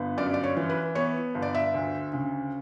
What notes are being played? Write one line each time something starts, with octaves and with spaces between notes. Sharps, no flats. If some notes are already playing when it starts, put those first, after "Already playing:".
Already playing: G1 B3
F#2 D5
D5
C#5
E3
B4
B3 C#5
G1
D5
E5
D2
C#3